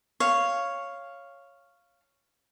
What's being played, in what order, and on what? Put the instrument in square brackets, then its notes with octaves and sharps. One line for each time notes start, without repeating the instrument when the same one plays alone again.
[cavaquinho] C#5 F5